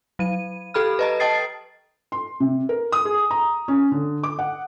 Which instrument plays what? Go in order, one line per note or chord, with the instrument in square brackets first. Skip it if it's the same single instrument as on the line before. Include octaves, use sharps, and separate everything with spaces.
[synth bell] F#3 D#7
G4 A4 B5 F6
B4 D#5 A#5
D#5 G5 A5 D#6 A6 C7
[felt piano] C6
C3
A#4
D#6
G#4
A#5
C#4
D3
D6
F#5